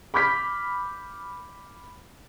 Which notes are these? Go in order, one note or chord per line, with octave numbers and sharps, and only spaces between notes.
B5 D6 F6 G6 B6